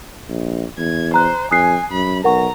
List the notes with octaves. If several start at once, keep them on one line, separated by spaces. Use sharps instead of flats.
A#1
E2 G#6
C5 A#5 F#6
F2 G#5 D#6 F#6 C7
F#2 B5
B1 A#4 F#5 A#5 C#6